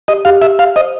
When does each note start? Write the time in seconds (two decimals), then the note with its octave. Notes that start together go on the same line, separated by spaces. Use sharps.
0.08 G4 D#5
0.25 G4 F5
0.42 G4 E5
0.59 E5 F5
0.76 C5 D#5